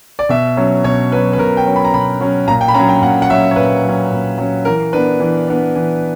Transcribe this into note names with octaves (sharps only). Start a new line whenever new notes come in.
D5
B2 E5
F#3 C#4
B2 C#5
F#3 C#4 B4
B4
B2 A#4
G5
F#3 C#4
B5
A#5
B2 B5
F#3 C#4
A#2 A#5
G5
B5
F#3 C#4 A#5
G5
A#2 F#5
F#5
F#3 C#4 E5
C#5
A#2 B4
F#3 C#4
A#2
F#3 C#4
E3 A#4
B3 D4 B4
E3
B3 D4
E3